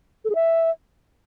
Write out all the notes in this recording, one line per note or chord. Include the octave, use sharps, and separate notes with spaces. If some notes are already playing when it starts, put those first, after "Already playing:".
A4
G#4
E5